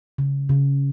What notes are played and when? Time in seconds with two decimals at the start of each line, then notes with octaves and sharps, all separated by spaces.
0.18 C#3
0.49 C#3